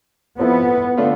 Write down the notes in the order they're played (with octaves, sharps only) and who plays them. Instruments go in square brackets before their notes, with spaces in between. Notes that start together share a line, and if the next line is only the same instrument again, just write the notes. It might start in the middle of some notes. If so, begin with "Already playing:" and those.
[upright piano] F3 C4 E4 A4 [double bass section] B3
[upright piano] D3 A3 D4 F4